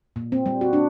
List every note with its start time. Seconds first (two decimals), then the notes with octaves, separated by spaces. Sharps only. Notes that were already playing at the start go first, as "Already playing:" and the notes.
0.16 A#2
0.32 C4
0.46 G3
0.61 F#4
0.73 D4